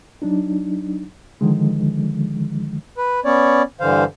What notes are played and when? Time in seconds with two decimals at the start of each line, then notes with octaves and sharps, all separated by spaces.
0.22 F#3 D4 D#4
1.41 D3 D#3 F3 G#3
2.98 B4
3.25 B3 C#4 C#5 D5
3.80 G2 D3 E3 C5 F5